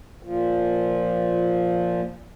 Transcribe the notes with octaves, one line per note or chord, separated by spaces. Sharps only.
A#2 F3